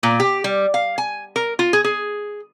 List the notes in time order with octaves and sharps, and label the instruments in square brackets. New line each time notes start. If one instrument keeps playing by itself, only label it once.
[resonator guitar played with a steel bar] A#2
G4
G3
F5
G#5
A#4
F4
G#4
G#4